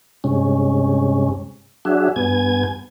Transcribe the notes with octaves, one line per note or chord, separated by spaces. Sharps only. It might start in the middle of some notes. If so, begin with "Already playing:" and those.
G2 C3 G#3 C#4
F#3 D4 F#4 G#4 E5
G2 B3 G#5 G#6